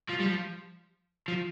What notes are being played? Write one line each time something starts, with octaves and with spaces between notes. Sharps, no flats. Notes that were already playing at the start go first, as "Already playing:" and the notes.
F3
G3
F3
F3